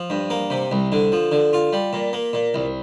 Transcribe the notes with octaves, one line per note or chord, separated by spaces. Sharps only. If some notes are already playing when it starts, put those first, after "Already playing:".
Already playing: F3
G2
A#3
C3
C2
D3
F3
D3
F4
G3
A#2
A#3
A#2
C2